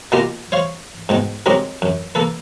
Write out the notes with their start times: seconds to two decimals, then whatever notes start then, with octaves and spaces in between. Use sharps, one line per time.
0.12 B2 A#3 B3 F4 G4 A#4
0.52 C5 C#5 F5
1.09 G#2 B2 G5
1.46 F#3 G#3 C4 D#4 G4 A#4
1.82 F#2
2.15 A#3 A4 B4